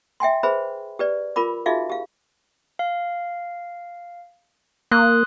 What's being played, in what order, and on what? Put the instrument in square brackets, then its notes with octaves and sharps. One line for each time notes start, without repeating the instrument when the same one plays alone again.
[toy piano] E5 G5 G#5 C6
G#4 B4 C5 E5 B5
G4 B4 D5
F4 A#4 B5 D6
D#4 F4 F#4 G#4 E5 F5
G4 F5
[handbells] F5
[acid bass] A#3 [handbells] C6 D#6 F#6